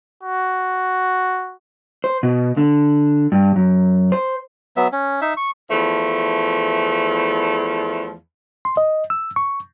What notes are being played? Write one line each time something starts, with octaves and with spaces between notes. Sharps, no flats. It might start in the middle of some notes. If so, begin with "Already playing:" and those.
F#4
C5
B2
D3
G2
F#2
C5
F#3 B3 E5
C#4
D#4 E5
C#6
E2 F3 A3
C6
D#5
E6
C#6